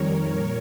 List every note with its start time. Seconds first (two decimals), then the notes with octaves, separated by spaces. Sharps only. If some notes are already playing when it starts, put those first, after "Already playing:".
Already playing: F2 D#3 G3 A#4 C#5
0.29 A#2 A#4 C#5